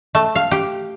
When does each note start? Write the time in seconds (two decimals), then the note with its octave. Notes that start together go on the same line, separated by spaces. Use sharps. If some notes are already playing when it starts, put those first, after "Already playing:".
0.15 A3
0.35 F5
0.51 G4